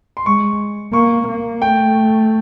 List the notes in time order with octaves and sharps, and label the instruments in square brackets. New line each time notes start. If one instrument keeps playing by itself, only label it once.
[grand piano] C6
[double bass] G#3 [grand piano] C#6
[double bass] A#3 [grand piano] C#6
[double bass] A#3
[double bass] A3 [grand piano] G5